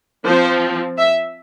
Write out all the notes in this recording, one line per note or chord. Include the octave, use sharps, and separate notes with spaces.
F3 C4 C5
E5